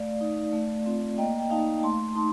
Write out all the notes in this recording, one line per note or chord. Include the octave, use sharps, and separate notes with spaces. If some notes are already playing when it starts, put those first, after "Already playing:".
Already playing: A3 D5 F5
D#4
A3
C4 F4
A#3 D#5 G5
G5
D#4 F5 A5
A3 A5 C6
D#4 A5 C6